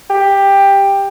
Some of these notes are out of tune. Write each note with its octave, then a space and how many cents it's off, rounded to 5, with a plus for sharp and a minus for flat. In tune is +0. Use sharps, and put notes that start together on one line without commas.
G4 +10